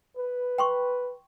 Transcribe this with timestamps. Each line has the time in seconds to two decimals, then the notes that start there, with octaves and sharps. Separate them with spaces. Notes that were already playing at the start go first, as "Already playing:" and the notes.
0.16 B4
0.58 G5 C6 C#6